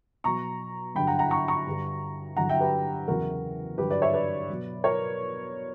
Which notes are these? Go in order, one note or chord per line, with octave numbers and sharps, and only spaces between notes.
B2 F#3 A#5 C#6
G2 D3 F#3 G5 B5
F#5 A#5
F#5 A#5
A#5 C#6
A#5 C#6
G2 D3 G3
G2 D3 F#3 F#5 A#5
E5 G5
G4 B4
E2 C#3 F#3 F#4 A#4
G2 D3 F#3 G4 B4
B4 D5
C#5 E5
B4 D5
B2 F#3
A#4 C#5